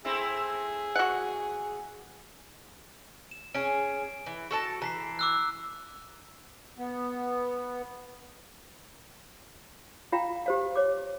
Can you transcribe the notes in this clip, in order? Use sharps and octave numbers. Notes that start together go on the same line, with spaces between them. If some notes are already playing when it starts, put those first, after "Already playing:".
A3 C4 E4 G#4
F#4 F#5
E7
C#4 G#4 D7
E3
F#4 A4 A5
E3 A#5 B6 C7
D6 E6 F#6
B3
F4 F5 G5 A#5
G4 C5 F5
C#5 D6